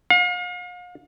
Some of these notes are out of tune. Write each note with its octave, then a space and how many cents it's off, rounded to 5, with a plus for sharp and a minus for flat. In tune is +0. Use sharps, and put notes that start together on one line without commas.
F5 +40